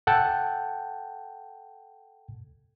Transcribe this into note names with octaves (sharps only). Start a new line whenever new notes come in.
A4 F#5 G5 A5